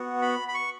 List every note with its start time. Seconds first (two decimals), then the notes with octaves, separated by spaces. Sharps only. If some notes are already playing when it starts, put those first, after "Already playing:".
Already playing: B3 F#4
0.22 B5
0.48 B5
0.55 C#6